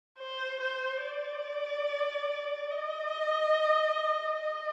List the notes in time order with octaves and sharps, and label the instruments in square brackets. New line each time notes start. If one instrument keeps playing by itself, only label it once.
[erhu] C5
C5
D5
D#5
D#5